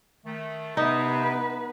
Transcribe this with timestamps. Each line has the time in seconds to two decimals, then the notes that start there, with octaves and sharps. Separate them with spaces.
0.25 D#3 A3
0.77 C3 B3 D#4 B4